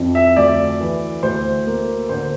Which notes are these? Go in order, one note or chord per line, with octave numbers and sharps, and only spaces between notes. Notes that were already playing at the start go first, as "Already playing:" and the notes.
Already playing: F2 E4
E5
D2 D5
E3
D2 C5
A#3
D3 C5